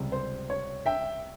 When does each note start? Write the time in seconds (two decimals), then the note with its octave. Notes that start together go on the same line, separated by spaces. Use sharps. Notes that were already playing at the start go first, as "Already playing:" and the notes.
Already playing: C#2 C3 G3
0.12 C5
0.50 C#5
0.86 E5 G5